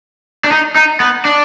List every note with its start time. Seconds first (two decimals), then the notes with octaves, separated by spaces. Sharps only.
0.44 D4
0.51 D#4
0.76 D#4
1.00 B3
1.25 D4